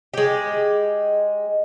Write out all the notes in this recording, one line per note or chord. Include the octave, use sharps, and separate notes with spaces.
G#3 G4